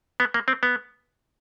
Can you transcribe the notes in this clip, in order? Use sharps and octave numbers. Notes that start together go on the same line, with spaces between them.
B3
A#3
C4
B3